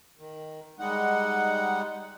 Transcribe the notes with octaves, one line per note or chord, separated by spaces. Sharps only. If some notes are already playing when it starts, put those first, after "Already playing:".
D#3
G3 G#3 D#4 F#5